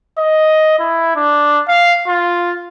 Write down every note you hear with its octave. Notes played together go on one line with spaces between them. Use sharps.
D#5
E4
D4
F5
F4